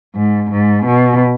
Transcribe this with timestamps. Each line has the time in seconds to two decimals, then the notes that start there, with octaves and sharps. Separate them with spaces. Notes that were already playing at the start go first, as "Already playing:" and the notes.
0.15 G#2
0.51 G#2
0.86 B2